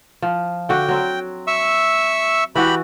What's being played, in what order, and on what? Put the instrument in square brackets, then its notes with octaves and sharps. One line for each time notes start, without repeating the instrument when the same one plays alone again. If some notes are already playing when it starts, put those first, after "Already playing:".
[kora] F3
[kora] D3 F#4 [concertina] G5
[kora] F#3 C4
[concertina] E5 C#6 E6
[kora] E3 F#4 [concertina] G4 B5